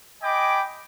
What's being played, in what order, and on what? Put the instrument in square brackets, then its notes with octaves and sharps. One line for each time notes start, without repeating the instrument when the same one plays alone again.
[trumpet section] D#5 G5 G#5 B5 D6